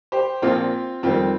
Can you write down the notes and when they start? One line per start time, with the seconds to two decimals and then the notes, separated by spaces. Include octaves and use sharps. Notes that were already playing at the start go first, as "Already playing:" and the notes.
0.12 G4 C5
0.42 A#1 A#2 F3 C4 F4
1.03 F2 D#3 G3 C4 F4